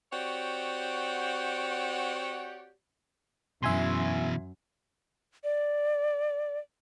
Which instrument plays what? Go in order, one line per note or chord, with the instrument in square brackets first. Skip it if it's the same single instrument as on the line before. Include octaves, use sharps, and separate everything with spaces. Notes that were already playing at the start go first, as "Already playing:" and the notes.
[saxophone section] C4 F#4 G4 C#5 D5 F#5
[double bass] F#2 [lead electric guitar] B2 E3 [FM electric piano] E5 G#5 C6
[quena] D5